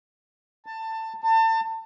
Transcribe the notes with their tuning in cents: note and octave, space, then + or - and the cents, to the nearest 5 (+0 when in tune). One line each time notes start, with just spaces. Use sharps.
A5 +20
A5 +35